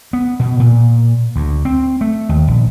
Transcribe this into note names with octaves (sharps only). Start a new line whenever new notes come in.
B3
B2
A#2
D2
C4
A3
D#2
A#1